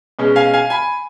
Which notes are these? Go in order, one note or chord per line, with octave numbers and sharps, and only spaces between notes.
B2 G#3 C#4
F5 G#5
F5 G#5
G#5 B5